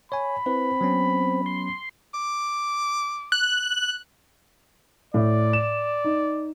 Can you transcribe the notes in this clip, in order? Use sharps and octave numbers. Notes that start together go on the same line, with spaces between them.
C#5 G#5 B5
C4 E4 B4
F#3 B3 C#4
C6
D6
F#6
A2 D5
E7
D#4